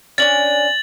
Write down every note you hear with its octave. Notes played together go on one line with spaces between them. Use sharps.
C#4 D4 G#5 A6 F#7